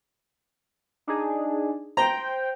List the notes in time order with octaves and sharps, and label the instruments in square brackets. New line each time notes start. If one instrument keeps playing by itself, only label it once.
[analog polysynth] D4 D#4 G#4
[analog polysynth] C5 G5 [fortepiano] A#5